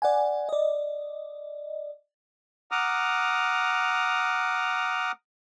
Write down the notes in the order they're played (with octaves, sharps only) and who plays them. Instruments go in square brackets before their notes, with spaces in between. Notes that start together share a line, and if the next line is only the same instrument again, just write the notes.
[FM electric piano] D5 F#5 G#5
D5 D#5
[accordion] F#5 A#5 D6 D#6 F6